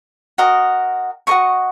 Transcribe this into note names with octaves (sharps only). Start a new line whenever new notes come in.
F#4 A#4 D#5
F#4 A#4 D#5 C#6